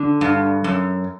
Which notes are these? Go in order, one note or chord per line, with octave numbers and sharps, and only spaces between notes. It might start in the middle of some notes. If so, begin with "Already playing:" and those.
Already playing: D3
G2
F#2